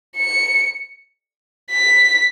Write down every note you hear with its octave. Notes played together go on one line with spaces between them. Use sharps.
C#7
B6